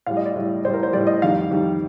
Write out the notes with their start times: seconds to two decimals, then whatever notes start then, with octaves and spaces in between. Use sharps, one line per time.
0.06 A2 G3 F5
0.17 D#5
0.25 D5
0.35 A2 G3
0.65 A2 G3 C5
0.74 A#4
0.83 C5
0.93 A2 G3 D5
1.07 D#5
1.22 F2 D#3 G3 F5
1.50 F2 D#3 G3